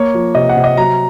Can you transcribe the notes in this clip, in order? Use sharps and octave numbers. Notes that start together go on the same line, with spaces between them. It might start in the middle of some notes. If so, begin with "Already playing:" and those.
Already playing: A#3 C#5
F3
C3 D#5
F#5
C3
D#5
F#3 A#5